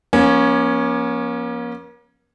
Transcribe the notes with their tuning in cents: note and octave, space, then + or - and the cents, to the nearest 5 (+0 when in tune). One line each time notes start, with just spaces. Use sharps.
F3 +0 A#3 +40 C#4 +0